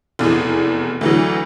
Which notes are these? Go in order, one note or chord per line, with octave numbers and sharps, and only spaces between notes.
F1 E2 B2 G#4
D2 E3 F#3